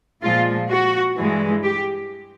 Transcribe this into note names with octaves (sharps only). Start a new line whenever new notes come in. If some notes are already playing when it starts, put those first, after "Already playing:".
A#2 F3 G#3 F4
F#4
G2 E3 G#3
G4